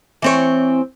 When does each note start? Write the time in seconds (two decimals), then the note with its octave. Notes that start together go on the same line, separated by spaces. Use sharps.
0.22 E3 C4 C#5